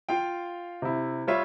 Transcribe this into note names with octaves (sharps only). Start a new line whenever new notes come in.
F4 F5 G5
C3 E4
G3 F4 C#5 E5